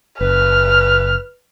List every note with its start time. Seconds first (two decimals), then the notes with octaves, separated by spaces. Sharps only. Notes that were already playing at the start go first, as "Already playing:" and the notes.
0.21 F#1 B4 F6